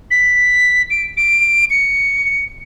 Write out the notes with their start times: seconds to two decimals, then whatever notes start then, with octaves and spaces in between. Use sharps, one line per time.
0.11 B6
0.90 D7
1.17 D7
1.70 C#7